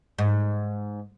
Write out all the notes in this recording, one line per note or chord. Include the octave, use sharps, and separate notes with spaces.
G#2